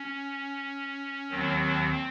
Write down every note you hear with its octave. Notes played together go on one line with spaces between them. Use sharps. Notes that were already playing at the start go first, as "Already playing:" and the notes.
Already playing: C#4
D#2 D#3 F#3 C4